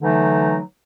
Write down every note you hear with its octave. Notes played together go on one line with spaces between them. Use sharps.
D3 E3 F#3 A3 D#4